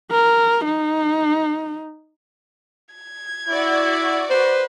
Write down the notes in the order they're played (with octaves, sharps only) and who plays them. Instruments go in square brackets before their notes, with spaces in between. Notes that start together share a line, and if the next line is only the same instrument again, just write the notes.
[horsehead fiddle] A#4
D#4
[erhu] G#6
[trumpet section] E4 [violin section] F#4 D5
[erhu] B4 [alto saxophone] C5